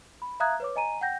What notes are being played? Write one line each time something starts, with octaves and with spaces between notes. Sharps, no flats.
B5
E5 F5 A#5 D#6 F#6 G#6
B4 C#5 D6
D#5 G#5 A#5 D#7
F#5 G5 G6 A#6